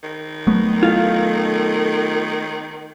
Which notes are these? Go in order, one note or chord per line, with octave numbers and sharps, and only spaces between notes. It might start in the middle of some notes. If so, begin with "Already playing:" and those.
D#3
F#3 A3 B3
F4 A4 F5